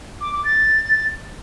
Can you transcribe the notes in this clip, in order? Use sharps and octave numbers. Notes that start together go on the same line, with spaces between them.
D6
D6
A6